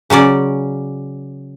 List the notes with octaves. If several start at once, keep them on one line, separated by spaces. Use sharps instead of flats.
C#3 F#3 C#4 D5